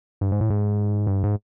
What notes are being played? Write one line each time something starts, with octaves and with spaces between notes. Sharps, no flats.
G2
G#2
A2
G#2
G2
G#2